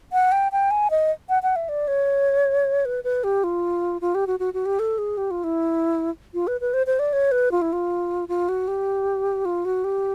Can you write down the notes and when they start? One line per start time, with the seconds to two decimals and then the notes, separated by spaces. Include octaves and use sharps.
0.13 F#5
0.32 G5
0.52 G5
0.71 G#5
0.91 D#5
1.29 F#5
1.43 F#5
1.56 E5
1.69 D5
1.88 C#5
2.85 B4
3.04 B4
3.24 G4
3.44 F4
4.01 F4
4.15 G4
4.27 F#4
4.40 F#4
4.54 F#4
4.66 G4
4.79 A4
4.98 G#4
5.17 G4
5.31 F4
5.44 E4
6.34 F4
6.47 B4
6.61 B4
6.74 C5
6.87 C5
6.99 D5
7.13 C#5
7.32 B4
7.52 F4
7.62 E4
7.73 F4
8.29 F4
8.49 F#4
8.68 G4
9.45 F4
9.65 F#4
9.84 G4